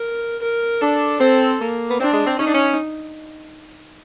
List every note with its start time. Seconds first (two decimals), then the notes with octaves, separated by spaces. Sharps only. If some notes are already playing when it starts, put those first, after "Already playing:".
Already playing: A#4
0.42 A#4
0.82 D4 A4
1.20 C4 A4
1.60 A#3
1.90 B3
2.00 C4 D4
2.13 G#3
2.26 C4
2.39 C#4 D#4
2.47 D4
2.54 C#4